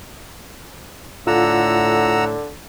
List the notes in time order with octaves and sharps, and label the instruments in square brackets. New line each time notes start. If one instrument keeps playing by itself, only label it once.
[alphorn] A2 [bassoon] D3 [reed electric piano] F4 [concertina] F#5 A#5 E6